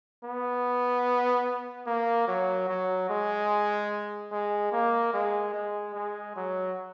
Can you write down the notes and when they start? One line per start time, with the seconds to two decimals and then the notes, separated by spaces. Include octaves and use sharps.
0.24 B3
1.87 A#3
2.28 F#3
2.68 F#3
3.10 G#3
4.32 G#3
4.72 A#3
5.13 G#3
5.54 G#3
5.95 G#3
6.36 F#3